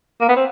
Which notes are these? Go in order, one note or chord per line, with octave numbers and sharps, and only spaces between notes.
A#3
B3
C4